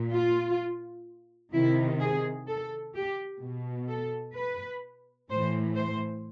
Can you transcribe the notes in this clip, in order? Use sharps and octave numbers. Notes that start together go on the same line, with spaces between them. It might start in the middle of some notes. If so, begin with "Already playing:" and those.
Already playing: A#2
F4
C3 D#3 E4
G#4
A4
G4
B2
A4
B4
A2 E3 C5
C5